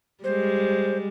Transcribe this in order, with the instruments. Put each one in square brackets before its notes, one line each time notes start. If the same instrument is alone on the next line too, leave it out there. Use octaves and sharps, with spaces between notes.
[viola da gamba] G3 G#3 [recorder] C5